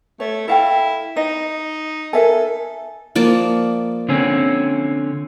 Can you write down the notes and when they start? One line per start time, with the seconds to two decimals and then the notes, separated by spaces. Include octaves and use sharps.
0.20 A3 C#5
0.48 E4 A4 F5 G5
1.16 D#4 D#5
2.13 A4 A#4 E5 G#5
3.16 F3 A#3 D5
4.09 D3 C4 C#4